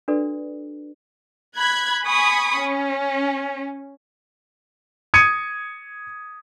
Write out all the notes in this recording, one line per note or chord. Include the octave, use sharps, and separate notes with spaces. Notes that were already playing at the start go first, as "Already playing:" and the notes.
D4 F#4 A4 B4 D5
B5 F#6 G#6
G#5 B5 C#6 D#6
C#4
D#6 G#6 C#7 D#7